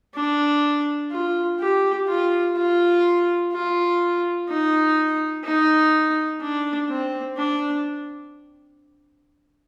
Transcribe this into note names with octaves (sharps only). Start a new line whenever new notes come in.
D4
F4
G4
F4
F4
F4
D#4
D#4
D4
C4
D4